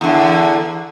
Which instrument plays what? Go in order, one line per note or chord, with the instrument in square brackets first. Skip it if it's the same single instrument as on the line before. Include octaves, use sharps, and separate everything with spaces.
[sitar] E2 D3